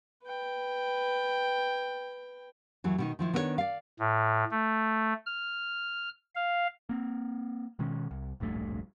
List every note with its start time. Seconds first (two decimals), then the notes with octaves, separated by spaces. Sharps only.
0.24 B4 G5
2.84 D#2 E3 F#3
2.98 B2 D#3 D#4
3.19 D#3 F3 E4
3.33 D#3 B3 D4 F#4 C#5
3.58 D5 F5
3.99 A2
4.51 A3
5.26 F6
6.35 F5
6.89 A#3 C4
7.79 B2 D#3 G#3 C#4
8.11 C2
8.40 D1 A#1 G2 A3